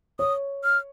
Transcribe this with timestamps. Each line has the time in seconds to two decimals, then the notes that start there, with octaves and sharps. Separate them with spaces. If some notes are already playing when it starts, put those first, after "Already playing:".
0.19 C#5 D#6
0.64 F6